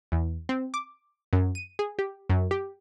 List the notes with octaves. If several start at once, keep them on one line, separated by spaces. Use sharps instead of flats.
E2
C4
D6
F#2
D#7
G#4
G4
F#2
G4